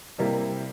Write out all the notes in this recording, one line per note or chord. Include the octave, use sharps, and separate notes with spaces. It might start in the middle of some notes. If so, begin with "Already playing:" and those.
C3 G3 A#3 E4